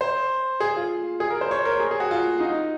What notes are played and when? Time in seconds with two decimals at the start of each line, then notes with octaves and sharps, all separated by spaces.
0.01 C5
0.60 G#4
0.76 F4
1.20 G#4
1.30 A#4
1.41 C5
1.51 C#5
1.65 A#4
1.80 G#4
1.91 G#4
2.00 F#4
2.11 F4
2.40 D#4